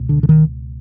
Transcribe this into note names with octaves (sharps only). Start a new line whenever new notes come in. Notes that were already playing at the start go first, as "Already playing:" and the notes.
Already playing: C#2 B2
D3
D3
D#3